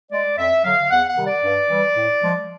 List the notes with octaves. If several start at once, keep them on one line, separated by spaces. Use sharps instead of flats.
G#3 D5
F2 E5
D3 F#3 F5
E2 F#5
F#5
C3 D#3 G3
D5
G2
E3 G3
A2
F3 G#3